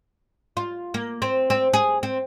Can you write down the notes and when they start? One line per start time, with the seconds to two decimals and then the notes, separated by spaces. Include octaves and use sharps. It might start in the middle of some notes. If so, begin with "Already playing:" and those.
0.57 F4
0.94 A#3
1.22 C4
1.50 C4
1.73 G#4
2.03 C4